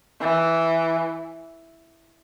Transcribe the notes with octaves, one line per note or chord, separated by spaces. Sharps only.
E3